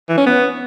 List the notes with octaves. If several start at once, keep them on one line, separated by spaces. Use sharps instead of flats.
E3
C#4
B3